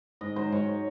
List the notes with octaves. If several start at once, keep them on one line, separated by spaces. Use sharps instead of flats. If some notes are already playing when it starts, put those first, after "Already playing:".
G#2 D#5
F#3 C5
G#2 C#5